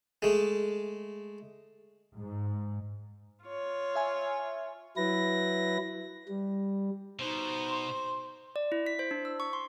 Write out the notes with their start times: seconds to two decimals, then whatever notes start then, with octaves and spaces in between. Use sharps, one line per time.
0.22 G#3 A3
2.17 G#2
3.44 F4 C#5
3.96 E5 G#5
4.97 F#3 E4 B4 A#6
6.28 G3
7.19 B2 D#4 C5
7.69 C6
8.56 D5
8.72 E4
8.86 B6
8.99 C5
9.11 D4
9.25 E6
9.40 C#6
9.53 C6